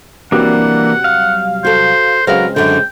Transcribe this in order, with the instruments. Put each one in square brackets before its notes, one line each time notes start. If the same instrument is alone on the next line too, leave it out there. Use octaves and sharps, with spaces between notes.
[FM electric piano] C3 F#3 G3 [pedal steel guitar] E3 A#3 D4 [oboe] F#5
[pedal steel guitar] F5
[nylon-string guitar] F#4 A4 [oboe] C5
[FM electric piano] C#3 G#3 C4 [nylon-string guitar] F#3 B4 F5 [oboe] A#4
[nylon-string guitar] F#2 D3 [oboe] G5